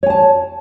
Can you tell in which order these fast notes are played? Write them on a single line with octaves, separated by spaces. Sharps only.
C#5 G#5 A5